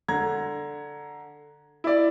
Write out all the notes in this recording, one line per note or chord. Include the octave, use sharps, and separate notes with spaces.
D3 A#5 G#6
E4 D5